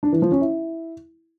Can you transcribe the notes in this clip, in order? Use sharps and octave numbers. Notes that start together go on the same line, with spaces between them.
D4
E3
F3
C#4
E4